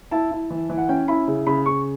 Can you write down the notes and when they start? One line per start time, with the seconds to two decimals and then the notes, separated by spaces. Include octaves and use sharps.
0.11 E4 A5
0.31 E4
0.50 E3
0.70 E3
0.78 F#5
0.89 C#4 G5
1.08 E4 B5
1.28 C#3
1.46 C#3 B5
1.66 C#3 C#6